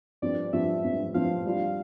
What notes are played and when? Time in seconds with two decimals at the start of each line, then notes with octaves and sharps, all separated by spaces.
0.22 G2 F3 C4 D5
0.53 G2 F3 C4 E5
0.84 G2 F3 C4
1.14 G2 F3 C4 F5
1.46 G3 D4 F4